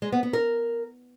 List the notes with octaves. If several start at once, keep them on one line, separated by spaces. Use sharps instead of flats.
G#3
B3
B3
A#4